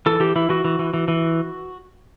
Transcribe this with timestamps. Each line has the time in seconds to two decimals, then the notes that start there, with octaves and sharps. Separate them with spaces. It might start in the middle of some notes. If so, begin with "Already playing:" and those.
0.06 E3 A4
0.20 E3 G4
0.36 E3 E4
0.49 E3 F#4
0.65 E3
0.79 E3
0.94 E3
1.08 E3